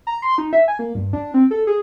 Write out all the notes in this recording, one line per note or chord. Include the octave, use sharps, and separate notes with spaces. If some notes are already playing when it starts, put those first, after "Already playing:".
A#5
C6
D#4
E5
G#5
A#3
G2
D4
C4
A4
G#4